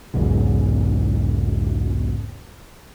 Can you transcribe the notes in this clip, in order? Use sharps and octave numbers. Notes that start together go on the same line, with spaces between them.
B1 E2 G#2 C#3